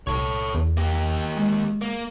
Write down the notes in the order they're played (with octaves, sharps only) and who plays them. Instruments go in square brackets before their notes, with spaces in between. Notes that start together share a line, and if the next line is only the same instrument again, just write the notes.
[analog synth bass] C2 [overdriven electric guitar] A4 C#5
[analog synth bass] E2
[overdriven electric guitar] A#3 G4
[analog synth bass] G#3
[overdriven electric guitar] A#3